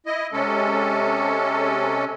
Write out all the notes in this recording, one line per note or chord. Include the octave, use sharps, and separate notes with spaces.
E4 D#5
C3 G#3 C#4 A4